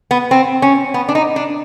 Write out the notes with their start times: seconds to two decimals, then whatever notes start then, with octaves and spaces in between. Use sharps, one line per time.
0.11 B3
0.31 C4
0.62 C#4
0.94 B3
1.09 D4
1.15 D#4
1.36 D4